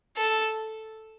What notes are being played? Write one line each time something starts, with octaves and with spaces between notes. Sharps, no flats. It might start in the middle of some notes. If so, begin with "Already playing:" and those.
A4